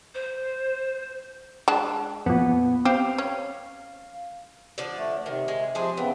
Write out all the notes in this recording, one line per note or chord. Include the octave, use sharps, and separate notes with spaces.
C5
G#3 D4 A5
F2 A#2 B3
C4 G4 F5
C#4
D3 F3 D5
A3
C3 D#3
G#3
C3 F3 D4 G#4 C5
C#3 E3 B3 C4